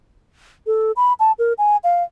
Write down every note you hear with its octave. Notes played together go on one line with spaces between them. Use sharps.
A4
B5
A5
A#4
G#5
F5